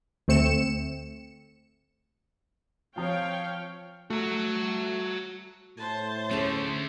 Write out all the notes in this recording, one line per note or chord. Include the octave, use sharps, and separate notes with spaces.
D2 A3 C4 C#7 E7
F3 C4 F4 C#5 F5 G5
A3 F#4 A#5
A2 C5 A5
D3 A3 C#4 G#4 C#5